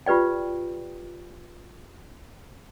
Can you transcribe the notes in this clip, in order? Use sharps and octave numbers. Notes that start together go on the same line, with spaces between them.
F4 G4 B4 D5 G5